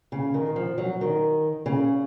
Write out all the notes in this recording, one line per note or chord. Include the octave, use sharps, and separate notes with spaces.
C#3
D#3
F3
F#3
D#3
C#3